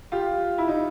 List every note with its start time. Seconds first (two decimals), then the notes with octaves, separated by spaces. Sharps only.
0.12 F4 G4
0.58 E4
0.68 D#4